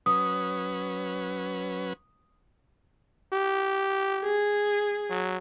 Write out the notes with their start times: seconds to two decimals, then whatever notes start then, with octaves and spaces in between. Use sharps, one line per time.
0.06 F#3 C#4 B4 D#6
3.32 G4
4.24 G#4
5.10 F#3